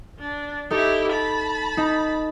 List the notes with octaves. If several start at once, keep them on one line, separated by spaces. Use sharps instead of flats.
D4
D#4 E4 G4 A4
A5 B5
D#4